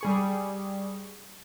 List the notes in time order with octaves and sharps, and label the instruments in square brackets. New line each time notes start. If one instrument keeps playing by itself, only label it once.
[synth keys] G3 G#4 C#6